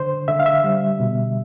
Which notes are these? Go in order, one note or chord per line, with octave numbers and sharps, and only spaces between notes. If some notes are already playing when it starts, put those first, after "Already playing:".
Already playing: D3 C5
D3 E5
F5
E5
G3
B2